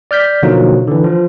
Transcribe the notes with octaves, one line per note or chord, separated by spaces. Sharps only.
D5 F6 G6 B6
B2 D3 F3 F#3 A#3 D#4
D3 E3
F3